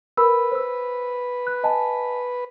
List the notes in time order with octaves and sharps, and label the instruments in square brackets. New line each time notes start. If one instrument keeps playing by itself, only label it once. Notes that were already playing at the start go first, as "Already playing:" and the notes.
[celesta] A#4 B5 E6 [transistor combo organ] B4
[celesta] C5 E6
F#6
D#5 G#5 A5